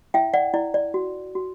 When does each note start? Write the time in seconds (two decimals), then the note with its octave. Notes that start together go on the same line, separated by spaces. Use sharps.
0.14 E4 E5 G5
0.34 D5 F#5
0.54 E4 D5
0.74 D5
0.94 F#4
1.35 F#4